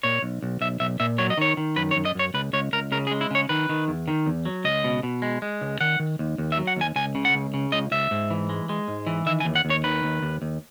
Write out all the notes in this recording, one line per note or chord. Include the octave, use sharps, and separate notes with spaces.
A#2 C#5
B1
B1
B1 E5
B1 E5
A#2 E5
F#3 C#5
D#5
D#3 C#5
D#3
F#2 B4
C#5
F#2
D#5
F#2 C#5
C#2 B4
C#2 C#5
C#2 A#4
C#3 A#4
G#4
G#3
E4
C#3 C#5
D#3 B4
D#3
E2
D#3
E2
F#3
C#2 D#5
B2
B2
G#3
G#3
C#2
D#3 F#5
D#3
D#2
D#2
E5
F#3
F#5
D#2 G#5
C#2 G#5
C#3
F#5
C#2
C#3
C#2 D#5
C#2 E5
G#2
E3
G#3
G#3
G#2
E3
D#3 E5
G#5
D#2
F#5
D#2
C#5
D#3 B4
D#2
D#2
D#2